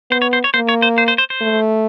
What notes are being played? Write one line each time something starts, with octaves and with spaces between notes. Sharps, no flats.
B3 C5
C#5
C5
C#5
A#3 C5
C#5
C5
C5
C5
C5
C5
A3